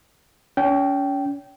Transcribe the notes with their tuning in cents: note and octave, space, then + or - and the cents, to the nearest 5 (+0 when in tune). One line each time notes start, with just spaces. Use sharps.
C#4 +35 G5 -15